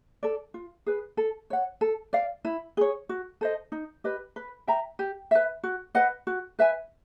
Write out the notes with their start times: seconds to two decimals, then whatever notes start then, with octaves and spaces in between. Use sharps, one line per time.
0.23 A4 D5
0.54 F4
0.86 G#4 B4
1.17 A4
1.50 C#5 F#5
1.81 A4
2.13 D5 F5
2.45 E4
2.77 G#4 C#5
3.09 F#4
3.41 A4 C5 D#5
3.72 D#4
4.04 G4 B4 D#5
4.36 B4
4.67 E5 G5 A#5
4.99 G4
5.31 B4 E5
5.63 F#4
5.95 B4 D#5 F#5
6.27 F#4
6.59 B4 E5 G#5